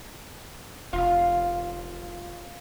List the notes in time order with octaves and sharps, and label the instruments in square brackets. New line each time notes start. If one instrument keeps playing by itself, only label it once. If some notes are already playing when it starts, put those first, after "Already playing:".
[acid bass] F1 [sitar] F4